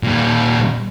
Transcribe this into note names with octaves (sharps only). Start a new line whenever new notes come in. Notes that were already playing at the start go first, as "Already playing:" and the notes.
A#2 G3